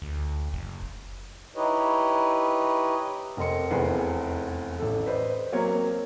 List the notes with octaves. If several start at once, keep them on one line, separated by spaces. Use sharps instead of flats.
D2
F#1
D#4 E4 G4 B4 C#5 D#5
F1 A#4 D#5 C6 C#7
F1 E2 G#4 B4 F#5 C7
A1 A4
B4 C5 D5 D#5
F#3 A#3 C4 C#5 G#6